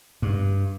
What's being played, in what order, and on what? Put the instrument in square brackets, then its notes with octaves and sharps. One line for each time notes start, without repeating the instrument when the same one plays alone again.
[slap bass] G2